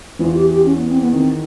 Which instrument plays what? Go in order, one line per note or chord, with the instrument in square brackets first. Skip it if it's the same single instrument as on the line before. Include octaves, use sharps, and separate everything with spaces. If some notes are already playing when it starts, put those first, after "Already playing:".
[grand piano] E2 E3 [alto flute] F4
[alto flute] G4
G4
C#4
B3
C4
B3
[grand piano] D#3 [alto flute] C4